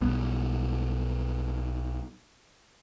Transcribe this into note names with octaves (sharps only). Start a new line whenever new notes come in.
B1 G3 B3